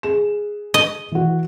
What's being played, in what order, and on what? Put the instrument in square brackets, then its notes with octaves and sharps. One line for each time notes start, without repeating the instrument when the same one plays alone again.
[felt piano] G#4 E7
[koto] D#5
[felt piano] E3 F#4